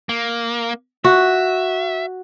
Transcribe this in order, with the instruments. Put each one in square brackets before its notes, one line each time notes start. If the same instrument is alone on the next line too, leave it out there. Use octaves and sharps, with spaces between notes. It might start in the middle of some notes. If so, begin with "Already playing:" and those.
[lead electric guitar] A#3
[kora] F#4 [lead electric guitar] E5